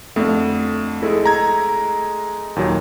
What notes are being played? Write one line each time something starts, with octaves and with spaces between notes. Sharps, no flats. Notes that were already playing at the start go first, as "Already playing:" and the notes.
F2 D3 A3
G#3 A3 E4
A#5 G#6
D#2 A#2 F#3